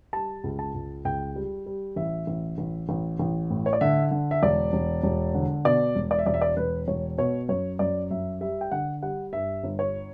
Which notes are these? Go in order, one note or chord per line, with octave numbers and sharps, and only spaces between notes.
G3 A5
C#2
A5
C#2
C#2 G5
G3
G3
A1 E5
A1
A1
A1
A1
A2
C#5
D5
D3 E5
D3
E5
E1 D5
E1
E1
D3
B2 D5
E1
D5
E5
E1 D5
E5
D5
E1 B4
E1 C#5
B2 C#5
F#2 C#5
F#2 D5
F#2 E5
G3 E5
G5
D3 F#5
G3 F#5
G2 E5
G1
C#5